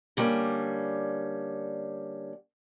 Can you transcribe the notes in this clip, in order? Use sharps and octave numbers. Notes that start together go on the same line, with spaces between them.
D3 G3 A#3 C#4